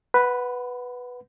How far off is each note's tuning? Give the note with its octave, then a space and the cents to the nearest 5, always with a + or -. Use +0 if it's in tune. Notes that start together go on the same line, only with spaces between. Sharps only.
B4 +0 F#5 +0 B5 +45